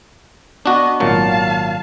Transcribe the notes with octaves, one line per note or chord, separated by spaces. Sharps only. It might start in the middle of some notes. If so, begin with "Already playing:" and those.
B3 D4 F#4 D#5
G#1 A#2 F#3 F5 A5